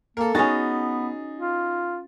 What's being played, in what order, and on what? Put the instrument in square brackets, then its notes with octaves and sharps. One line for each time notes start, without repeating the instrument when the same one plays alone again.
[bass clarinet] A#3 [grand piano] A4 A#4
[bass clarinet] B3 [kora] C#4 F#4 [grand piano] D#4 G#4 A6
[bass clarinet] F4